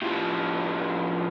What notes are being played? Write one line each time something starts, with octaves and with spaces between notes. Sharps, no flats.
A2 F3